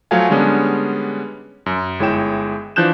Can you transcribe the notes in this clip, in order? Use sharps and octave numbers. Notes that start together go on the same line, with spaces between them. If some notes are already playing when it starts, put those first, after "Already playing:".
F3 F#3 A3 C#5 F5 G#5
D3 G3 G#3 B3 C#4 D4
F#2
G1 G#3 E4 C#5 G5 E7
E3 F3 D4 F#6 G6 E7